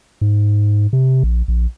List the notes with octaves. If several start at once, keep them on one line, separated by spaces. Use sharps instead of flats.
G#2
C3
A#1
A#1